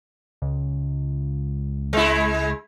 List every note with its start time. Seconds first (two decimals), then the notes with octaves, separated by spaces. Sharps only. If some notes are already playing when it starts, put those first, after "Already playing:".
0.42 C#2
1.93 G#3 E4